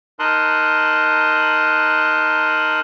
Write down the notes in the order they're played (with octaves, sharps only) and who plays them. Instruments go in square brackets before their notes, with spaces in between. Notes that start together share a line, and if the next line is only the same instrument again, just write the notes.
[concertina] D#4 A#4 A5 C6 D#6 F#6